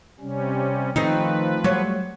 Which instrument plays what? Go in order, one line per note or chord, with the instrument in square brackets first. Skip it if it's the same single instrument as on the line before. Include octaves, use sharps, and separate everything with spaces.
[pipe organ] C3 G3 C#4
[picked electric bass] D#3 [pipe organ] F3 B4 [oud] A3 C4 D#4
[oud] F#3 C#5 [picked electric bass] G3 A3